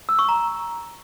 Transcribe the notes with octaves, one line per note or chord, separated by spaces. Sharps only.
E6
C#6
A#5